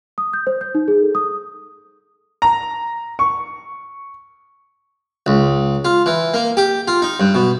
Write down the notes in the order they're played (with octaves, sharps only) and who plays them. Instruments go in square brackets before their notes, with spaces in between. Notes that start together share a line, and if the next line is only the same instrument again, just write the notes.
[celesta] D#6
G6
C5
G6
D#4
G#4
A4
D#6
[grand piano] A#5
C#6
[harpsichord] C#2
F4
E3
A#3
G4
F4
D#4
G2
B2